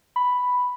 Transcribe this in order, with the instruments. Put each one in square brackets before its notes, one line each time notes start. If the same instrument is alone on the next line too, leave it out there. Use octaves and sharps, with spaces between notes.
[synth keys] B5